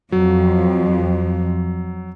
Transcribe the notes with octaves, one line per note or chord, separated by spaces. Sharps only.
F2 F#3